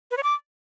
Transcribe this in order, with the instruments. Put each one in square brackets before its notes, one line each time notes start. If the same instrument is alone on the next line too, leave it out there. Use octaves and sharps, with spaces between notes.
[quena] B4
C#5
D6